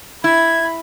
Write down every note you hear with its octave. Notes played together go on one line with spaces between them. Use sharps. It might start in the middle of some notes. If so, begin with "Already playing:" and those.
E4 B5 G#6